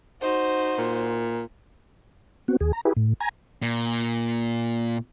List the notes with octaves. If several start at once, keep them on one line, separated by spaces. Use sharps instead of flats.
D#4 F#4 C5
A#2
B3 C4 F#4
D#2 G#4
A#5
E4 G4 G#4 B4
A2
G#5 A#5
A#2